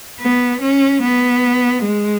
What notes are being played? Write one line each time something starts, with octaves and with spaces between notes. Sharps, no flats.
B3
C#4
B3
G#3